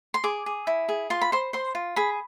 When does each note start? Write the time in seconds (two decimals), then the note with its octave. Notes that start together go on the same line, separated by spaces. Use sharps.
0.14 C6
0.24 G#4 D6
0.46 G#4
0.67 E4
0.89 G#4
1.10 F4 C6
1.21 B5
1.32 C5 C6
1.53 C5 C6
1.75 F4
1.96 G#4 B5